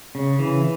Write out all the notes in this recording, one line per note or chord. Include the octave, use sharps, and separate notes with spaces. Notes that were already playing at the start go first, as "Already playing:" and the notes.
C#3
E3